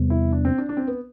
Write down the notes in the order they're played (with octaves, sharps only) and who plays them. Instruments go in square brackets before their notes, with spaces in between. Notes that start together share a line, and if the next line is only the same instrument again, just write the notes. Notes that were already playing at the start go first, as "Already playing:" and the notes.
Already playing: [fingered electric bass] E2 C3 G3 B3
[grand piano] E4
D4
C4
D4
D4
C4
B3